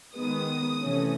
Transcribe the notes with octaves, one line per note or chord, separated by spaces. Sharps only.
D#3 G#3 B3 D#6
C3 E3 A3 C#4